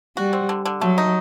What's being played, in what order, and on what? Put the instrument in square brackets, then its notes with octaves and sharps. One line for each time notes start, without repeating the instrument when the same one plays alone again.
[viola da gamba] G3 [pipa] F#4
[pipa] C4
D3
D3
[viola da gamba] F#3 [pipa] A3
[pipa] D#4